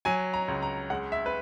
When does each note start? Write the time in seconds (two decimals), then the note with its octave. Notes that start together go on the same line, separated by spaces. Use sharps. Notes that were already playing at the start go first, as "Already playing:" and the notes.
0.05 F#3 G#5
0.34 A#5
0.48 C#2
0.63 A#5
0.90 G#3 F#5
1.12 E5
1.26 B4